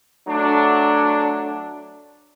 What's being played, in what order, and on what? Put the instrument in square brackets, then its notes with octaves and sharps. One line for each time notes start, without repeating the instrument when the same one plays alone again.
[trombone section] F#3 A3 D4